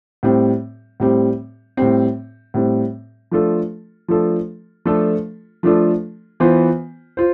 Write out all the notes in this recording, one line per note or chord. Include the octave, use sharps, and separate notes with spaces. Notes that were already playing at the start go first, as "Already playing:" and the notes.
A2 G3 C4
A2 G3 C4
A2 G3 C4
A2 G3 C4
F3 A3 D4 F4 A4
F3 A3 D4 F4 A4
F3 A3 D4 F4 A4
F3 A3 D4 F4 A4
E3 B3 F4 C5
F4 C5